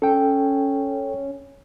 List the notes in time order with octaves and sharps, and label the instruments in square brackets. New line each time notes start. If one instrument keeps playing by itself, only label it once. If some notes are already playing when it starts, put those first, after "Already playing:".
[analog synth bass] C#4 [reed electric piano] A4 G5